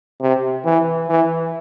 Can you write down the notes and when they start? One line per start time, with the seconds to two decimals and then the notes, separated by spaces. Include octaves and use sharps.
0.21 C3
0.65 E3
1.08 E3